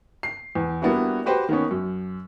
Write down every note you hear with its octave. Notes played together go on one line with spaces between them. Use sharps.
C7
E2
G3 A#3 B3 D4 E4 F#4
F#4 G4 B4 C5
D#3 A#3 B3 C#4
F#2